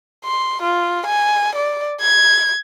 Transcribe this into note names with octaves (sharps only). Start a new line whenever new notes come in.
C6
F4
G#5
D5
G#6